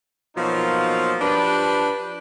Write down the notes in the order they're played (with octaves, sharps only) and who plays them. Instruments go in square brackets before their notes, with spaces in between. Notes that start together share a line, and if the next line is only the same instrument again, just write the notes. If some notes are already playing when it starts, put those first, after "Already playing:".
[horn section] B2 F3 F#3 A#3 D#4 F4
F3 D4 G4 B4